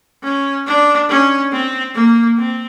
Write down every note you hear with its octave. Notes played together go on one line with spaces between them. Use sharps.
C#4
D4
C#4
C4
A#3
C4